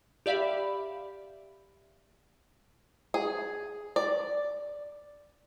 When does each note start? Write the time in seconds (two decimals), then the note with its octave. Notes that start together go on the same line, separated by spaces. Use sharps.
0.26 G4 D5 E5 F5 B5
3.14 G#4
3.96 D5